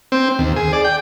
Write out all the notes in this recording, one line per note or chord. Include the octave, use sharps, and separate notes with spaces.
C4
D#2
G#4
D5
G5